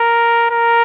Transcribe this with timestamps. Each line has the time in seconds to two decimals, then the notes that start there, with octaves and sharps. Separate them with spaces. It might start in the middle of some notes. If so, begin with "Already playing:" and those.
Already playing: A#4
0.51 A#4